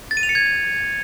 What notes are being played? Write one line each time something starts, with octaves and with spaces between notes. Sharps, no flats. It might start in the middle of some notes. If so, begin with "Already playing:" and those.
A6
D#7
F7
C#7
G#6